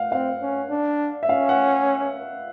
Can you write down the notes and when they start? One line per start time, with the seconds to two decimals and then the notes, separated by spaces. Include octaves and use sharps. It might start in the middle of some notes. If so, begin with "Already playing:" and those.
Already playing: F5 F#5
0.12 C4 F5
0.42 C#4
0.70 D4
1.23 E5
1.29 C#4 F5
1.49 F#5